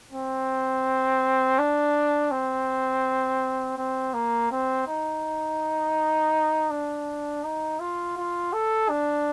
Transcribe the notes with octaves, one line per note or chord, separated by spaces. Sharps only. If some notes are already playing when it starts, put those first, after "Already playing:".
C4
D4
C4
C4
A#3
C4
D#4
D4
D#4
F4
F4
A4
D4